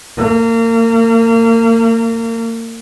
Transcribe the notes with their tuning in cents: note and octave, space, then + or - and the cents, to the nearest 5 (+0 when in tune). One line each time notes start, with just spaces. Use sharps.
A#3 -30